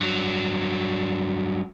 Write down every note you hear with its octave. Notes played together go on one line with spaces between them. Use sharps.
G2 F#3